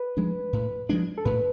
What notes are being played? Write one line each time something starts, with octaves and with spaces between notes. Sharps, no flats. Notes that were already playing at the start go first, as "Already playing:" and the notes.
Already playing: B4
F3 G#3 D4
A2
F3 G#3 D4
A4
A2 B4